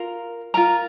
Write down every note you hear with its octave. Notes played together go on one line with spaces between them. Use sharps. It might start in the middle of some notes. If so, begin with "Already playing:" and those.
Already playing: F4 A#4
F4 A#4 A#5